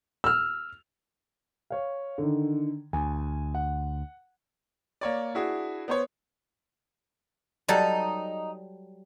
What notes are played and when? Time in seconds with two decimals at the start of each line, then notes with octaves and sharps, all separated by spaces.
0.24 E6 F6
1.70 C#5 F5
2.18 D3 D#3
2.93 D2 G#5
3.54 F#5
5.01 A#3 C#5 D5
5.34 D4 E4 F#4 G#4
5.88 B3 C5 C#5
7.69 F#3 G3 D#4 A4